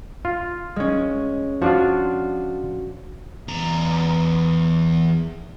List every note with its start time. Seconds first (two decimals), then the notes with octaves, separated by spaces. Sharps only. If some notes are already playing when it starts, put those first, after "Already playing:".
0.25 F4
0.76 G#3 C#4
1.62 F3 D4 F4 F#4
3.48 E2 A#5